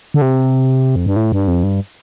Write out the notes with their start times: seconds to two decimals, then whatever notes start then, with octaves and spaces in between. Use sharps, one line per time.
0.14 D3
0.22 C3
0.96 F2
1.06 G2
1.16 A2
1.32 G2
1.48 F2
1.64 G2